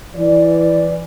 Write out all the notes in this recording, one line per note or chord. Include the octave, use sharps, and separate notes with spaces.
E3 D5